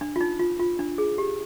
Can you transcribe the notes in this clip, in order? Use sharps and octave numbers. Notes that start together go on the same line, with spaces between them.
D4
F4
D#4
F4
F4
D4
G#4
G4